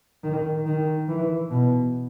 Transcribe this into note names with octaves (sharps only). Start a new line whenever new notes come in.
D#3
D#3
E3
B2